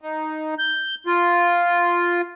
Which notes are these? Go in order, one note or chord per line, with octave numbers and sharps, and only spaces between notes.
D#4
G6
F4